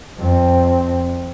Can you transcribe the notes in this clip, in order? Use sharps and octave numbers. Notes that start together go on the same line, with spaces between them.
F2 C4